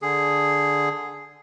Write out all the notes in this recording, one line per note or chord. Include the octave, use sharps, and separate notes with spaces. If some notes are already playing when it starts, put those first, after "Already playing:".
D3 G#4